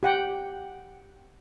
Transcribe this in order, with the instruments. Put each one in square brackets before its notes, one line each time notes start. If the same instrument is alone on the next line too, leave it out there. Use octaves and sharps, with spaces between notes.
[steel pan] G4 F#5 G5